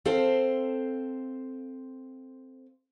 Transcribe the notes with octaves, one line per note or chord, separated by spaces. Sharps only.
C4 A4 C5 F5